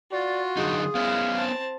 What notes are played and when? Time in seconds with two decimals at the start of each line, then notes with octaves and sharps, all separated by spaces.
0.12 F4 F#4 D5
0.57 D3 F#3 D#4 G#4
0.95 G#3 B3 C#4 E4 F5
1.36 C4 A5